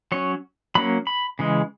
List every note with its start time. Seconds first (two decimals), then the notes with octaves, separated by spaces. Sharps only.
0.12 F#3 C#4 C#5
0.75 F#3 A#3 C#4 B5
1.07 B5
1.39 C#3 E3 G#3